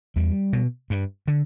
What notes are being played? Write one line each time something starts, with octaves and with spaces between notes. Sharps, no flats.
E2 G3
B2
G2
D3